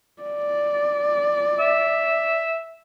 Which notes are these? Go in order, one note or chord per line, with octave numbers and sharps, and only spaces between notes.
D5
E5